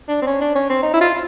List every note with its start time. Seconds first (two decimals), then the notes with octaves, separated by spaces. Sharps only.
0.08 D4
0.22 C4
0.27 C#4
0.41 D4
0.55 C#4
0.69 C4
0.83 D#4
0.93 E4
1.01 F4